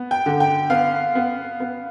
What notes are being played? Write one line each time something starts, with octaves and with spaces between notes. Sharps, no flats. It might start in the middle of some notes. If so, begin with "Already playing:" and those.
Already playing: B3
G5
D3
G5
B3 F5
B3
B3